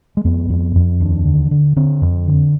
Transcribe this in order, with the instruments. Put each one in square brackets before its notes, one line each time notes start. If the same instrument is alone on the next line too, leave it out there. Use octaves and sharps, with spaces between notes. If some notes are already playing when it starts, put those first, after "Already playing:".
[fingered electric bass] G#3
F2 B3
F2
F2
D#2 D4
D3
D3
D3 C4
F2
D3